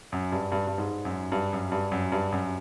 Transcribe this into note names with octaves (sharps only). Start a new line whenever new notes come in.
F#2
G2
G2
G2
G#2
F#2
G2
F#2
G2
F#2
G2
F#2